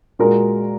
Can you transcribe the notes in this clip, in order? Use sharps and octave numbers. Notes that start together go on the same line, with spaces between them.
A#2 G#3 F#4 A#4